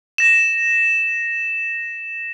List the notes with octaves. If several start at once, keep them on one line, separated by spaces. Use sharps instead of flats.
A#6 E7